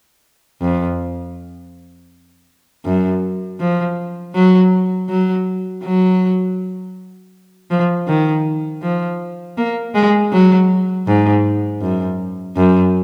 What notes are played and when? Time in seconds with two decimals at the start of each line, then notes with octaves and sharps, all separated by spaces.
0.61 F2
2.85 F#2
3.60 F3
4.35 F#3
5.09 F#3
5.84 F#3
7.71 F3
8.08 D#3
8.83 F3
9.58 A#3
9.95 G#3
10.32 F#3
11.07 G#2
11.81 F#2
12.56 F#2